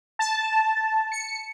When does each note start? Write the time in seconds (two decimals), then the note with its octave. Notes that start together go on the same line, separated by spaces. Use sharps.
0.19 A5
1.12 C#7